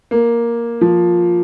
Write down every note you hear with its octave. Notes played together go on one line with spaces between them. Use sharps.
A#3
F3